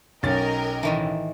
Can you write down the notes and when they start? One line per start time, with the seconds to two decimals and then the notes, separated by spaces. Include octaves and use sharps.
0.23 B1 C#4 A#4 D#5 G5 A6
0.83 A2 D#3 E3